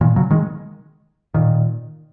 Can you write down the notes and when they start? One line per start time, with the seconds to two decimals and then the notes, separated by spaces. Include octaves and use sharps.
0.01 A#2 D#3
0.16 C#3 F#3
0.30 D#3 G#3
1.34 A#2 D#3